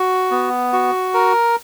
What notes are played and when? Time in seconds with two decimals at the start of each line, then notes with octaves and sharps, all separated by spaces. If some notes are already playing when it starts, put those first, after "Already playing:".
Already playing: F#4
0.31 B3
0.73 F#4
1.14 A#4